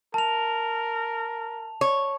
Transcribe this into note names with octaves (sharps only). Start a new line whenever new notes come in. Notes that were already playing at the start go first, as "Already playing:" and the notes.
A#4 A5 F7
C#5